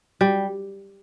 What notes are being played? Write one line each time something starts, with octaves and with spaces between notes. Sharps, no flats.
G3